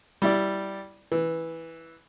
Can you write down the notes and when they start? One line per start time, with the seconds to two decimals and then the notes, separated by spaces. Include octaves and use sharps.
0.22 G3 E4 D5
1.12 E3